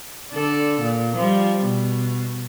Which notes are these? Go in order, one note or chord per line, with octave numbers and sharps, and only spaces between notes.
D3 A4 D5
A#2
F3 G3
B2